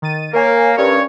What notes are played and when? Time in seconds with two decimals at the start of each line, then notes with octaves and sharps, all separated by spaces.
0.02 D#3 A6 D#7
0.33 A#3 A#4 C#5 G#5
0.77 G2 C#4 A#4 C#5